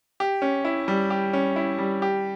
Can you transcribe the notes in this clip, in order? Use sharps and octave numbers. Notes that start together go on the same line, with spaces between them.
G4
C#4
E4
G3
G4
C#4
E4
G3
G4